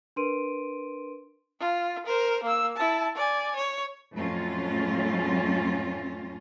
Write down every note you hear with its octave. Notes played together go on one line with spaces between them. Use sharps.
D4 A#4 B4 C6 D7 D#7
F4
A#4 C5
A#3 E6
E4 A5
D5 G#5
C#5
F2 A2 F#3 C#4 F4